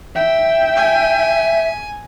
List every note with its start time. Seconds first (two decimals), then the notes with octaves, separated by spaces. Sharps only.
0.16 E5 G5
0.76 G#5